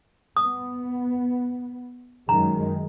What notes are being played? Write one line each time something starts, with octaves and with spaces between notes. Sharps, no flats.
B3 D#6
F#2 D#3 G#3 A#5